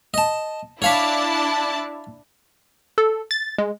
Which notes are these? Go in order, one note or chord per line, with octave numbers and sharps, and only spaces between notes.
D#5 A5
D4 E4 C#5 F5 A5 B5
A4
A6
G#3